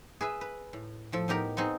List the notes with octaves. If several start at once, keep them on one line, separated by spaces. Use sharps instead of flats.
G#4 B4 E5
B4
A2
A2 F3 A4
A2 B3 D#4 G4 A#4 A#5
B3 C4 D#4 G#4